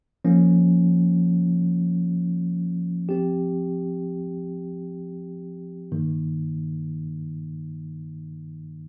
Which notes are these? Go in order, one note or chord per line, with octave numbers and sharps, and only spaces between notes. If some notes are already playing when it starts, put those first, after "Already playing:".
F3 A#3 C#4
F3 C4 G4
G2 D#3 A#3